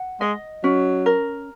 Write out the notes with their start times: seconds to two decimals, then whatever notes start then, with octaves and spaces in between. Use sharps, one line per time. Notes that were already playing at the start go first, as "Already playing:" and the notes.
Already playing: F#5
0.20 G#3 D#5
0.63 F#3 C#4
1.06 A#4